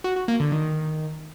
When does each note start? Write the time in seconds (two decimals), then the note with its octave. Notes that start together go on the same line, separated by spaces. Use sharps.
0.04 F#4
0.16 F#4
0.28 A#3
0.40 D3
0.52 D#3